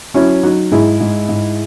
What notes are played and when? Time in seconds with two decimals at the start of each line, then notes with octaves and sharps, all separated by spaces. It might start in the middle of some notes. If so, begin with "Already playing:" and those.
0.14 F#3 C#4 E4
0.43 F#3 D#4 F#4
0.72 G#2 E4 G#4
1.00 G#2
1.29 G#2